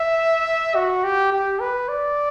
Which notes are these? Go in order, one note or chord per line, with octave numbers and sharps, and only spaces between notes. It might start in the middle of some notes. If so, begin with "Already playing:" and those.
Already playing: E5
F#4
G4
G4
B4
D5